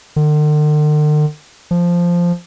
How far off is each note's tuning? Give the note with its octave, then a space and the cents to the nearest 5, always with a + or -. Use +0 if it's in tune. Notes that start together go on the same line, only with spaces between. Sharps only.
D3 +45
F3 -5